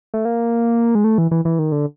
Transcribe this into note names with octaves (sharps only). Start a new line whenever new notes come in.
A3
A#3
G#3
A3
E3
E3
E3
D#3
D3